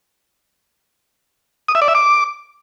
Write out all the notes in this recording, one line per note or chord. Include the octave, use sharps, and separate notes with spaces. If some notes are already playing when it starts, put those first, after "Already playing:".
D#6
E5
D5
E5
D6